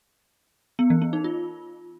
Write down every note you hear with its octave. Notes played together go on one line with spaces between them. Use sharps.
B3
E3
B3
D#4
F4